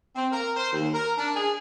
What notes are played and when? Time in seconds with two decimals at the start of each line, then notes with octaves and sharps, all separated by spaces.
0.15 C4
0.32 A#4
0.57 C5
0.72 D#2
0.94 A#4
1.18 D4
1.35 G#4